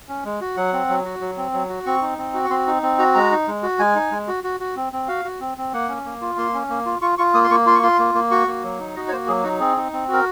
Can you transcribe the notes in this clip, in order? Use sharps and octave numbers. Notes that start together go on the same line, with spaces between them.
C#4
G#3
F#4
F#3 F#5
C4
F#3
F#4
F#3
C4
F#3
F#4
C4 C#6
D#4
C4
F#4
C#6
C4 C6
D#4
C4
F#4 A#5
G#3 A#5
D#4
G#3
F#4
G#3 G#5
D#4
G#3
F#4
F#4
F#4
C4
C4
F#4 F5
F#4
C4
C4
A#3 F#5
C#4
A#3
F4
A#3 C6
C#4
A#3
F4
F4 C#6
F4 C#6
A#3 D#6
C6
A#3 C#6
F4 C6
C#6
F4 C6
A#3
A#3
F#4 C#6
A#3
F#3
D#4
F#4 D#5
C#5
A#3 C5
F#3 G#4
D#4 F#4
C4 G#4
D#4
C4
F#4 A#4